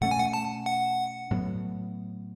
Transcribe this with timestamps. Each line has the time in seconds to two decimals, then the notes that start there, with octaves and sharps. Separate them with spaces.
0.01 B2 A3 C#4 F#5
0.11 G#5
0.20 F#5
0.33 A5
0.66 F#5
1.31 A2 F#3 B3